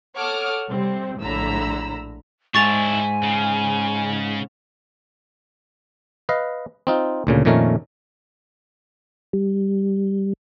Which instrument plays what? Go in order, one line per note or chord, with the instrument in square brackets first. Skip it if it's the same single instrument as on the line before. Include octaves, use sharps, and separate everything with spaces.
[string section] A4 C#5 F#5 D6 D#6 F6
C3 G3 C4
A#1 A2 D3 A#5 B5 E6
[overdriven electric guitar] G#2 [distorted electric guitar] D4 E4 [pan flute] G#5 [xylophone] C#6 A6 F7
[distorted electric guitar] C#3
[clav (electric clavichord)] B4 D#5 F5
C4 D#4 F4
D2 A#2 C#3
F2 A#2 D#3 A3 C#4 A#4
[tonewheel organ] G3